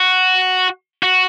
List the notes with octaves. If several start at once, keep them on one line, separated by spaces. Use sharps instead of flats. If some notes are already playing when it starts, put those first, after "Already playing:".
Already playing: F#4
F#4